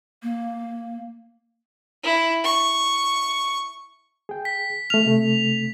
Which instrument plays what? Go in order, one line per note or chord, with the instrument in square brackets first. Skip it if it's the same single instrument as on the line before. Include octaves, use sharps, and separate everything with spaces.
[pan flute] A#3
[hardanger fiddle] E4
C#6
[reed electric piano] G#4 G5
[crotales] B6
[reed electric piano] A3 F6 [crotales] F7
[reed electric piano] C3 A3